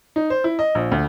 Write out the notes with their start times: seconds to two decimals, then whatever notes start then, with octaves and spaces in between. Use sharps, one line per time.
0.16 D#4
0.30 C5
0.44 E4
0.59 D#5
0.75 A#1
0.92 D2